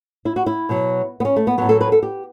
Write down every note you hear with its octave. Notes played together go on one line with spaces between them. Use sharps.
E4
F#4
E4
B2 F#3
B3
C#4
A3
B3
A2 F#3 B3
A4
B4
A4
G4